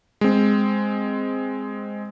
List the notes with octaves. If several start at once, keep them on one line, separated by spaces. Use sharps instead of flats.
G#3 C4